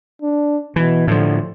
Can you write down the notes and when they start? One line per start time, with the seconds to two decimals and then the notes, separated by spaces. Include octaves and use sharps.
0.22 D4
0.76 B2 E3
1.07 A2 D3 F3